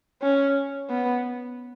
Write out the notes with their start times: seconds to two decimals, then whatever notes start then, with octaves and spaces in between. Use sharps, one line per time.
0.22 C#4
0.90 B3